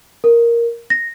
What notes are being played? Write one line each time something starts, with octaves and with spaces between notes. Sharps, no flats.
A#4
A#6